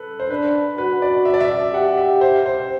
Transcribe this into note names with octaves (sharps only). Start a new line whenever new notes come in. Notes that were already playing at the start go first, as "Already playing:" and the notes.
Already playing: A4 B4
C5
D4 B4
F#4 B4
D5
E5
D5
E5
G4 F#5
E5
C5
C5